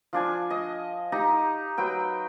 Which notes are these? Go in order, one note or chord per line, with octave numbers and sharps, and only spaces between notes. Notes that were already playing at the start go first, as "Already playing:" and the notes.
F3 D4 G#5
D#5
D#4 G4 A#5
F#3 B4 G5